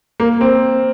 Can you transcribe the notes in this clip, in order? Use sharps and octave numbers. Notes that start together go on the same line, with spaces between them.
A#3
C4